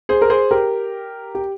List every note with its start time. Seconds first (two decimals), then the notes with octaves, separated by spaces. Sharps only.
0.09 G#4 C5
0.22 A#4
0.30 G#4 C5
0.51 G4 A#4
1.35 G4